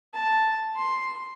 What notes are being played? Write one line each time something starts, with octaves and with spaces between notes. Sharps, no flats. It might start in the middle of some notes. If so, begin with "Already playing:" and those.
A5
C6